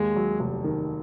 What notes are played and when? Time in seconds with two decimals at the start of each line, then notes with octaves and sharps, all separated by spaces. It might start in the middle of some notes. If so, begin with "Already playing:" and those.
Already playing: D#2 G#3
0.16 F#3
0.40 F1
0.64 D#3